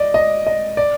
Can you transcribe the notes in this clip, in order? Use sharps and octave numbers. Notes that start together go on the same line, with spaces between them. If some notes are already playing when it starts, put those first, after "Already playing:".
Already playing: D5 D#5
D#5
D#5
D5